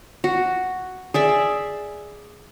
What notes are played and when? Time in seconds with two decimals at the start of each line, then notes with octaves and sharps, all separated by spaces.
0.24 F#4
1.14 G#4 D5 E5